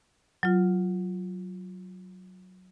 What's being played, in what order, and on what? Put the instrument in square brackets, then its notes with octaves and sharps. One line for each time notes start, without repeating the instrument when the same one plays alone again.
[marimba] F#3 F4